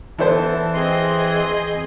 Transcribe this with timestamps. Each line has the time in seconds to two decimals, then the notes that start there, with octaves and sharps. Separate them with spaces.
0.19 E3 B3 E4 A4 C5 A5
0.74 C4 G#4 D#5 C6